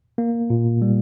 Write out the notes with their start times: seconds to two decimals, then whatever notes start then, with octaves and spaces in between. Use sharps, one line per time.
0.18 A#3
0.50 A#2
0.82 G3